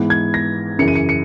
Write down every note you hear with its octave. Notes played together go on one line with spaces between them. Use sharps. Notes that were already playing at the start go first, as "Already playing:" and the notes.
Already playing: G#2 E3 B3
G#6
A#6
F#2 C#3 E3 C#7
D#7
C#7
C#7